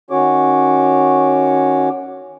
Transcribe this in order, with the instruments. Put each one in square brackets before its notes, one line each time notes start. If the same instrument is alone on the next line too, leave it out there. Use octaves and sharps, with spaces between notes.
[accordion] D#3 C#4 F#4 C#5 D6